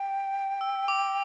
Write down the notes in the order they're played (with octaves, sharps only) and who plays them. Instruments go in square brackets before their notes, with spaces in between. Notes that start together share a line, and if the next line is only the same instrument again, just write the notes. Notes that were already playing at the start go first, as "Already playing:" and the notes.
Already playing: [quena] G5
[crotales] E6
D6